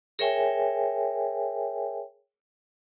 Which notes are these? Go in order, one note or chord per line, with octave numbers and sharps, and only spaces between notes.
G#4 A#4 C#5 E5 G5 G#5